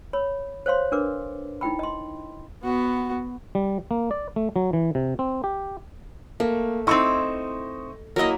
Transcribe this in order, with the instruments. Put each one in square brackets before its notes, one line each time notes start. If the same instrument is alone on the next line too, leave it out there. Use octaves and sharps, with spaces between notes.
[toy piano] C#5 B5
C5 C#5 F5 C6
D4 A#4 B4 D6
D#4 E4 G5 B5
D#5 C6
[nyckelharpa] B3 [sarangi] F#4
[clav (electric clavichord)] G3
A#3
D5
A3
F#3
E3
C3
C4
G4
[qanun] A3 [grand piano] A#3
[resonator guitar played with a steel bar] C4 D#4 E4 [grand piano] D#5 C#6
[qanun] F#3 A#3 E4 [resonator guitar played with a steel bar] A#4 D#5